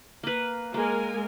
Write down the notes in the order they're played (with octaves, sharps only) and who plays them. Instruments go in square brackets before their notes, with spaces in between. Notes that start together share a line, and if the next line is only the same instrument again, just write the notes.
[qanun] A#3 B4
[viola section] G#3 A#4 G#5 [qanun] A#3